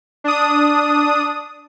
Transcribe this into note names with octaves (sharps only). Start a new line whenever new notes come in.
D4 D#6